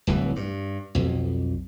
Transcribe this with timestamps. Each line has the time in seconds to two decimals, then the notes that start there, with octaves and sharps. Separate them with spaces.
0.07 D1 C2 E3
0.36 G2
0.95 B1 F2